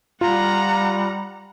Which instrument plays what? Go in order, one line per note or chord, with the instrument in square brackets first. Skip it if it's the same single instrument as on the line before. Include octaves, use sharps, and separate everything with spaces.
[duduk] G3 [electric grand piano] F4 [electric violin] F#5 A#5